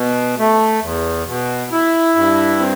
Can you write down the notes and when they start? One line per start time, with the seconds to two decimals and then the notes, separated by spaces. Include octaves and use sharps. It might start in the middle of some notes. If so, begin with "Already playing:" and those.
Already playing: B2
0.38 A3
0.82 E2
1.28 B2
1.72 E4
2.16 G2
2.59 C4